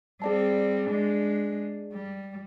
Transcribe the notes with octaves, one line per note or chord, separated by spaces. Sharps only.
G3 C4 G#4 D5 A5
G#3 D4
G3